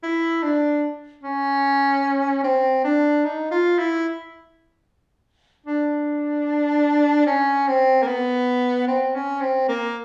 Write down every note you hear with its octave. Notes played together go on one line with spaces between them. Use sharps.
E4
D4
C#4
C4
D4
D#4
F4
E4
D4
C#4
C4
A#3
B3
C4
C#4
C4
A#3